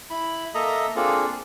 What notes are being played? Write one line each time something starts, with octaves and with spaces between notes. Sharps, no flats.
E4 B5
A#3 A4 D#5 E5 A#5 D#6
A#3 C4 D4 F4 G#4 A4